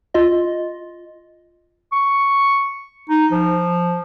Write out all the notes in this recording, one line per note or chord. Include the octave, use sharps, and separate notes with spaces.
F4 D#5
C#6
D#4
F3